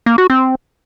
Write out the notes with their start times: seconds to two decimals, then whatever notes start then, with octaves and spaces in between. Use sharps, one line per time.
0.06 A#3
0.18 F#4
0.30 C4